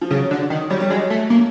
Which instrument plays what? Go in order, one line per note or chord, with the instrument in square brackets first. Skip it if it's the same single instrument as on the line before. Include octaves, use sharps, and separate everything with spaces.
[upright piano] F3
[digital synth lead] C#3 [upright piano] F#3
[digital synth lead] D3
D#3
[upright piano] F#3 [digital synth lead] G3
[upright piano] G3
[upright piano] F#3 [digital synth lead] G#3
[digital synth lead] A3
A#3